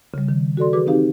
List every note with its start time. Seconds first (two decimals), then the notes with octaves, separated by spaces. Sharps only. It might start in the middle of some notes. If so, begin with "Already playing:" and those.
0.14 C#3 G3
0.29 D#3
0.57 F#4 A4 D5 C6
0.73 E3 F#4 G#4 B4 D6
0.87 C4 D#4 G4 F5